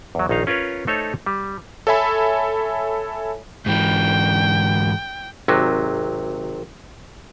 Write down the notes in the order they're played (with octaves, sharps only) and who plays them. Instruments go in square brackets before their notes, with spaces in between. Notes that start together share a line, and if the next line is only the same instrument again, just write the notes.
[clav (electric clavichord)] E2 F#3
A#1 D#3 D#4 F5
C#4 F4 A#4 B4 C#5
A3 D#4 A4 C5 C#5
G3
[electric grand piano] A4 C#5 E5 G#5 B5
[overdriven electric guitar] G#2 E3 [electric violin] G5
[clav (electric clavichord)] G#1 C3 F#3